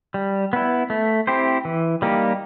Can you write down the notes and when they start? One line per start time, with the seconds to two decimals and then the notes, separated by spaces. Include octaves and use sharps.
0.14 G3
0.53 B3 E4
0.90 A3
1.27 C4 E4 G4 C5
1.65 E3
2.02 G3 A#3 D#4 G4